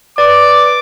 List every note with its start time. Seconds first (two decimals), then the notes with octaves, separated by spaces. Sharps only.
0.18 B4 D5 D6